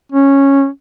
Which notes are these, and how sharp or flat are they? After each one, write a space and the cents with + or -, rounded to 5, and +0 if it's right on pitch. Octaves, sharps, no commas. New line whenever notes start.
C#4 -10